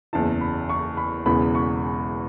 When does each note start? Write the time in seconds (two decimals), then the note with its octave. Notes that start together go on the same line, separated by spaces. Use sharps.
0.13 F#1 E2 C#3 E3 A5
0.41 B5
0.69 C#6
0.97 B5
1.26 E1 E2 C#3 E3 B3 B5
1.55 C#6